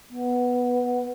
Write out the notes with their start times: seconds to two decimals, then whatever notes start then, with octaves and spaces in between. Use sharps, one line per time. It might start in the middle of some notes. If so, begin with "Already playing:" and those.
0.10 B3